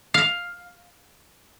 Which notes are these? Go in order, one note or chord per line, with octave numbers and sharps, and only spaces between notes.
F5